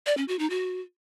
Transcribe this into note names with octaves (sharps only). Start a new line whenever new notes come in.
D5
C#4
F#4
D#4
F#4